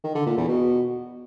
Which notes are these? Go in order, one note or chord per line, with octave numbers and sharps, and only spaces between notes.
D#3
D3
A#2
E2
B2